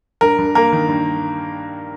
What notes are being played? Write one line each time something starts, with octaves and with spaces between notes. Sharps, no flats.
G2 A#4
G2
A#3 A#4
D#3
G2